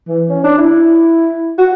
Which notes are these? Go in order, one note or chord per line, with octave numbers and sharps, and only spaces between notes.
E3
C#4
D4
E4
F#4